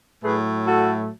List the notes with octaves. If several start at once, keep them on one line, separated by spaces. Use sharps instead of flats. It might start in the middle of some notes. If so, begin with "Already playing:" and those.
A2 F#3 A3 G#4 B4
F#4 A4